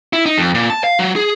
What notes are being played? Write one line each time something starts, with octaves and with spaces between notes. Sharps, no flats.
E4
D#4
F2
A#2
A5
F5
F#3
G#4